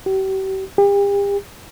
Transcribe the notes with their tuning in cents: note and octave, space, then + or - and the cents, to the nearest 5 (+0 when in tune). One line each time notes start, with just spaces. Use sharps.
G4 -40
G4 +40